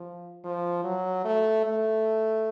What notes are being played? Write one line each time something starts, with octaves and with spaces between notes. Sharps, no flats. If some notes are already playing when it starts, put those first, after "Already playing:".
Already playing: F3
F3
F#3
A3
A3